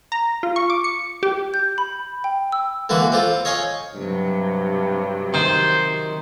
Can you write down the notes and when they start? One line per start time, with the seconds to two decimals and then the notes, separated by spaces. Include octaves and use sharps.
0.12 A#5
0.43 F4
0.56 C#6
0.70 D6
0.84 C#7
1.23 G4
1.54 G6
1.78 B5
2.24 G5
2.52 E6
2.89 D3 E3 A#3 F#4
3.12 C4 F4 A4
3.45 C#5 D#5 F5 G#5 C#6
3.94 G2 C3 F#3
5.34 D#3 C5